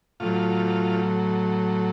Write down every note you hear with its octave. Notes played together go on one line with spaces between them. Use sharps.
A2 F#3 F4